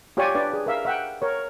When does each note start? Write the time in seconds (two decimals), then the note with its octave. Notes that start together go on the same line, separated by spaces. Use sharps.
0.17 F4 G4 C#5 D5 G#5 C#6
0.35 D4 B4 D5
0.53 G#4
0.66 A#4 E5 F5
0.85 E5 F#5 G5
1.22 A#4 C#5